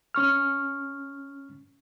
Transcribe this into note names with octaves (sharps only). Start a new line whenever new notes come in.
C#4 C#6 F6